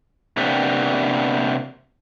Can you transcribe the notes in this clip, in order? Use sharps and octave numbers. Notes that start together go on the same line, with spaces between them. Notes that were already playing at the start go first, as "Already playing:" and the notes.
C3 A#3 B3 D4 G4